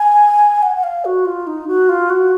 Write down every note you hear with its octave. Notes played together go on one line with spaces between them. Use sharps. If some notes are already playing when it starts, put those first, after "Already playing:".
Already playing: G#5
F#5
F#5
F5
F#4
F4
D#4
F#4
F4
F#4